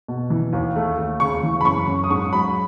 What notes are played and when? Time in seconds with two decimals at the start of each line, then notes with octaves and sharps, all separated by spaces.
0.08 B2
0.30 E3
0.53 D#2
0.76 A3
0.98 D#2
1.20 C#3 C#6
1.43 E3
1.61 B5
1.65 F#2 C#6
1.88 F#2
2.04 D#6
2.10 G#2 C#6
2.33 F#3 B5